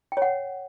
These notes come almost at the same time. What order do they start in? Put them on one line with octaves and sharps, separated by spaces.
G5 C#5 F#5